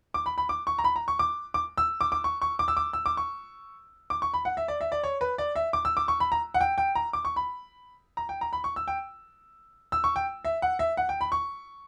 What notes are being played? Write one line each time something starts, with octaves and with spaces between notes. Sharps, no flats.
D6
B5
B5
D6
C#6
A#5
B5
A#5
C#6
D6
D6
E6
D6
D6
C#6
C#6
D6
E6
D6
E6
D6
C#6
D6
C#6
B5
F#5
E5
D5
E5
D5
C#5
B4
D5
E5
D6
E6
D6
C#6
B5
A#5
F#5
G5
G5
A#5
D6
C#6
B5
A#5
G5
A#5
B5
C#6
E6
G5
E6
C#6
G5
E5
F#5
E5
F#5
G5
B5
C#6